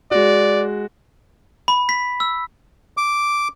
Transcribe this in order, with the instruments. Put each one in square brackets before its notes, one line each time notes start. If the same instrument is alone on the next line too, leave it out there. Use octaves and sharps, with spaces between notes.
[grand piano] G#3 F#4 [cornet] D5
[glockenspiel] B5
B6
E6
[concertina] D6